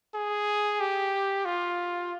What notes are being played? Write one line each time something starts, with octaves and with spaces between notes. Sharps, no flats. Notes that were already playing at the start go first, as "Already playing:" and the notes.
G#4
G4
F4